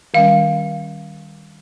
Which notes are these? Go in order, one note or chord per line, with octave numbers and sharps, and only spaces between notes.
D#3 G3 C#4 F5